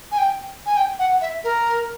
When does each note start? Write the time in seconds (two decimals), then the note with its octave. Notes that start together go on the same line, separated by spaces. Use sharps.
0.11 G#5
0.18 G5
0.66 G#5
0.76 G5
0.99 F#5
1.21 E5
1.44 A#4